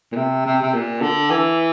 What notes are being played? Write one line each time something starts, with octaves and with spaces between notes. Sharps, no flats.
A#2
C3
C3
C3
A#2
D3
E3